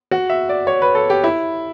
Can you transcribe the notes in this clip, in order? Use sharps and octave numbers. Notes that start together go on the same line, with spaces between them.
F#4
E5
D5
C#5
B4
A4
G4
E4